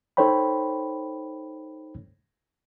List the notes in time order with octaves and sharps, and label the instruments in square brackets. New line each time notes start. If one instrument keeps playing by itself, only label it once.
[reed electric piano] D#4 A4 C5 C#5 G5 B5